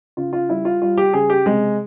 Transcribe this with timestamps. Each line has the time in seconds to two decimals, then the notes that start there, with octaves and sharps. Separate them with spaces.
0.17 C#3 F4
0.33 F4
0.49 G3 E4
0.65 F4
0.82 G3 F4
0.98 G4
1.14 C#3 G#4
1.30 G4
1.46 C3 G#3